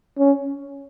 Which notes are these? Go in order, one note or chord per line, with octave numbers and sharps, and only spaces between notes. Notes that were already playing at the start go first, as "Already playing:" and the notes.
C#4